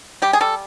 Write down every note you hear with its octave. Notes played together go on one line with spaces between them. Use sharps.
G3 G4
G#4
G3 A4